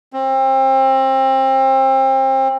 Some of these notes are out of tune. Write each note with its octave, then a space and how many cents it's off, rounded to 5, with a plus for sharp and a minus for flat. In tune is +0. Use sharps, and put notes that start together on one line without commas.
C4 +30